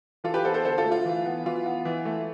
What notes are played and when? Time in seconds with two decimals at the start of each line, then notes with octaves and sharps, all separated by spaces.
0.24 E3 F4 A4
0.34 G4 B4
0.44 B3 A4 C5
0.54 A4 C5
0.64 D3 A4 C5
0.78 F4 A4
0.84 A3
0.92 F4
1.05 E3
1.25 B3
1.46 E3 F4
1.66 B3
1.85 E3
2.05 A3